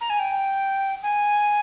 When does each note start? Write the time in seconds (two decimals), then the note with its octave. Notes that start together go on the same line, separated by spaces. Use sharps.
0.01 A#5
0.10 G#5
0.20 G5
1.03 G#5